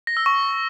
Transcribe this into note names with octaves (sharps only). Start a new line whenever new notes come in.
A#6
E6
C#6